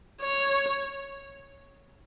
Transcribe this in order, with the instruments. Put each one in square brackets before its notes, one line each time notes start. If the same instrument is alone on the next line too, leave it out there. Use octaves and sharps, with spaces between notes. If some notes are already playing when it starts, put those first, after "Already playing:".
[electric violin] C#5